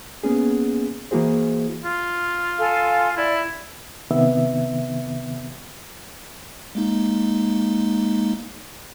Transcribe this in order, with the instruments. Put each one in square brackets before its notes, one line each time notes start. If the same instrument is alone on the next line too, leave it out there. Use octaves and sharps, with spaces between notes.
[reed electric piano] A#3 B3 C#4 G#4
E3 A#3 E4 F#4 G#4 C5
[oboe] F4
[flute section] A4 F5 G#5
[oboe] E4 [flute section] D5
[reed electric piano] C3 D#3 B3 E5
[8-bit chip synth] G#3 A#3 D#4